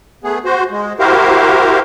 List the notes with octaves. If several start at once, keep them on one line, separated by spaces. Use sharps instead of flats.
A3 B3 G#4
F#4 C5
G#3
E4 F#4 G4 A#4 C5 F5